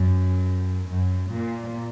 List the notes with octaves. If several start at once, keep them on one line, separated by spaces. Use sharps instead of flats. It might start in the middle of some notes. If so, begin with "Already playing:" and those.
Already playing: F#2
F#2
A#2